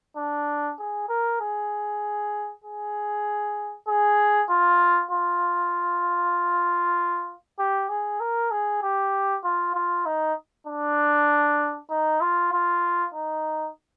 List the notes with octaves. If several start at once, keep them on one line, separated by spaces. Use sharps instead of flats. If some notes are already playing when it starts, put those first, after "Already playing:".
D4
G#4
A#4
G#4
G#4
G#4
F4
F4
G4
G#4
A#4
G#4
G4
F4
F4
D#4
D4
D#4
F4
F4
D#4